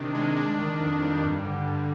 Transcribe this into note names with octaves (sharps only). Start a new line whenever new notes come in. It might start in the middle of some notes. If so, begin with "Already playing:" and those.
Already playing: C3 D#3 D4
G#3
D4
D#3
F2
G3
G2
D3
G2